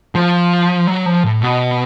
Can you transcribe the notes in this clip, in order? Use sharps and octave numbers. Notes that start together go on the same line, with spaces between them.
F3
F#3
F3
A2
B2